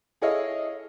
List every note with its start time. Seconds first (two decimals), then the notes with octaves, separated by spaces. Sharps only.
0.22 E4 G#4 A4 C#5 D#5 F5